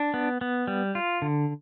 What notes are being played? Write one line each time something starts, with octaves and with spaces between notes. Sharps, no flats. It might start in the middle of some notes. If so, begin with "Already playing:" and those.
Already playing: D4
B3
B3
G3
F4
D3